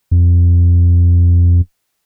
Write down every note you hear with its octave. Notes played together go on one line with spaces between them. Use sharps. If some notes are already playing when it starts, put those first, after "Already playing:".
F2